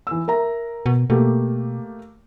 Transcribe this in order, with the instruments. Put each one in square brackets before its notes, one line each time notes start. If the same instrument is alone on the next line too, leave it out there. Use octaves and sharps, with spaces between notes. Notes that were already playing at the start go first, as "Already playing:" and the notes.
[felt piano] E3 E6
A#4 E5 A#5
[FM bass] B2
[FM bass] B2 [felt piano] A3 A#3 G4